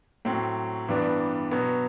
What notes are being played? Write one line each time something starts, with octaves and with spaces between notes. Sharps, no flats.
A2 F#3 C4
G2 E3 G3 B3 D4
B2 F#3 B3